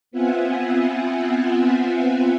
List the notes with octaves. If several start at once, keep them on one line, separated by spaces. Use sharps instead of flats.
B3 C4 F4 E5 F#5 G#5